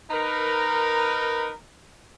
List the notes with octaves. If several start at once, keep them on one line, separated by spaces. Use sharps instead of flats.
D#4 A#4 B4